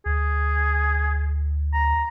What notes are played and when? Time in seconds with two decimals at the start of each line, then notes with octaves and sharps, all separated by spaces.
0.06 D2 G#4
1.73 A#5